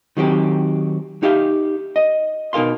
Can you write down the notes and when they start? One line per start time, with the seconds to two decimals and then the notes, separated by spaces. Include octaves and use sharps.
0.17 D#3 F#3 C4 G4
1.23 D#4 G4 E5 F5
1.96 D#5
2.53 B2 D#4 A#4 F5 C6